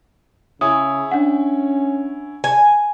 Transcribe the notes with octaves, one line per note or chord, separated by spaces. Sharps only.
C#3 E4 C#5 G#5 D#6
C#4 D4 F#5
G#5